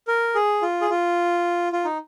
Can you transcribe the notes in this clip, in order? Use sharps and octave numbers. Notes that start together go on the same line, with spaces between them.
A#4
G#4
F4
G#4
F4
F4
D#4